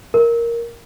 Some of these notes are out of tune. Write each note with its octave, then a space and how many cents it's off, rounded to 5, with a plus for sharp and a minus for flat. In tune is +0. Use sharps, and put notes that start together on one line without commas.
A#4 +0